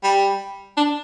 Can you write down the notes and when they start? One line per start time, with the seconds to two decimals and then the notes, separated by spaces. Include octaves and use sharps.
0.04 G3
0.77 D4